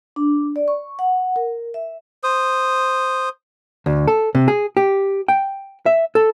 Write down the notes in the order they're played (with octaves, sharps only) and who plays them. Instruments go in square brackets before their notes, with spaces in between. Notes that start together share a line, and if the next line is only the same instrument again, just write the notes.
[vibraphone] D4
D5
C#6
F#5
A#4
E5
[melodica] C5 D#6
[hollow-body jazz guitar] D2
A4
C3
G#4
G4
G5
E5
A4